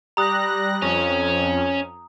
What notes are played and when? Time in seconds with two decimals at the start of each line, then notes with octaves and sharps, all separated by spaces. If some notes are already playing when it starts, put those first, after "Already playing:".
0.17 G3 A#5 D#6 F#6 A#6
0.82 F2 C#4